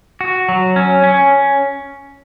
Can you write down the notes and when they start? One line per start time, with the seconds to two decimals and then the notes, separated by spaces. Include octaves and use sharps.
0.21 F#4
0.49 F#3
0.76 C#4
1.04 C#4